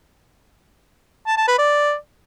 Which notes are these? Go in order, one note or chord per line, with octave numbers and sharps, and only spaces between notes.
A5
A5
B4
D5